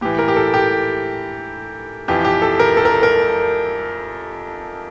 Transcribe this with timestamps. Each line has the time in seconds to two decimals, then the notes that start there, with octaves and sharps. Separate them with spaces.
0.01 A2 E3 G4
0.19 A#4
0.28 G4
0.36 A4
0.54 G4
2.08 F2 E3 G4
2.25 G4
2.42 A4
2.60 A#4
2.77 A4
2.85 A#4
3.03 A#4